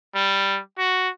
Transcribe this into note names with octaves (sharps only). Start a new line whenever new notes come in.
G3
F#4